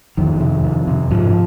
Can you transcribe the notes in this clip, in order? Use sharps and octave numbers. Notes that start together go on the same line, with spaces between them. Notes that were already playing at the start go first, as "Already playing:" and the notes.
F2 D#3
C3
F2
C3
G#2 F3